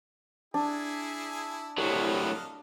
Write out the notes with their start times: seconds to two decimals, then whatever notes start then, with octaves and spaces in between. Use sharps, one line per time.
0.54 D4 E4 G#4 G#5
1.78 C2 A2 F#3 D#5 F5 F#5